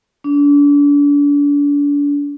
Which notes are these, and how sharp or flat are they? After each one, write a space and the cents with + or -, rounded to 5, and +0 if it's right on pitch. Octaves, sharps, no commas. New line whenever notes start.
D4 -35